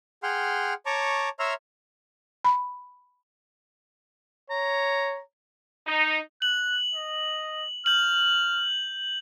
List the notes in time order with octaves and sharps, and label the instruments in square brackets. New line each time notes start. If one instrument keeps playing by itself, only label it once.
[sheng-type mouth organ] G#4 F#5 G5 C6 F6
C#5 A5 A#5 C#6 D6
C#5 E5 A#5 C6 E6 F6
[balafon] B5
[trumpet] C#5 [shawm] A#5
[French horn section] D#4
[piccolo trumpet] F#6 [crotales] F#7
[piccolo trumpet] D#5
[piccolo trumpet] F6 [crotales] G6 F#7